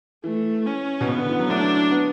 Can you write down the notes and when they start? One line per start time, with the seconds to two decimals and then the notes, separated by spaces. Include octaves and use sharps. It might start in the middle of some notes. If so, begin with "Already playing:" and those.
0.24 E3 A3
0.66 C#4
1.01 B2
1.08 C#3 B3
1.18 D3
1.29 E3
1.39 F#3
1.50 A3 D4
1.91 B3